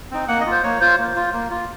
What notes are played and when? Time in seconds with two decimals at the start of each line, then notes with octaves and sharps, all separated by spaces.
0.11 C4 D#4
0.28 A#3 F#5
0.41 D#5
0.46 F4
0.52 C5
0.64 A#3 C#5
0.81 F4 C5
0.98 A#3
1.16 F4
1.34 A#3
1.51 F4